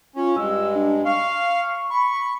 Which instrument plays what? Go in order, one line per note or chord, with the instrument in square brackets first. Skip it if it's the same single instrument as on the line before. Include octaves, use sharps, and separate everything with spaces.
[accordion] C#4 [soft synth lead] F4
[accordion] G2 G#3 [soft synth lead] E6
[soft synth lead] D4
[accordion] F5 [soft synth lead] C#6
[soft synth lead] B5 [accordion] C#6